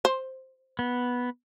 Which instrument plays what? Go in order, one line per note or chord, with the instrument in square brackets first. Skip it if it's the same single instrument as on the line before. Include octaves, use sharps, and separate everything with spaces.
[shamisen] C5
[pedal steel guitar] B3